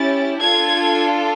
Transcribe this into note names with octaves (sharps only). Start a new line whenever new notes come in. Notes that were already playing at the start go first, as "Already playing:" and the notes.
Already playing: C#4 E4 G4 A6
D4 F4 A4 G#6